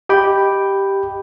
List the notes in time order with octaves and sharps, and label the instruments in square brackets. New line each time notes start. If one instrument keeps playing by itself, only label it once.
[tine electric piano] G4 D#5 G5 B5